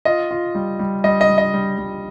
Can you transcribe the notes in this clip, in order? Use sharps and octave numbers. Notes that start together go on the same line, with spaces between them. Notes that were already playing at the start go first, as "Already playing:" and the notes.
F4 D#5
F4
G3
G3
G3 D#5
D#5
G3
D#5
G3
G3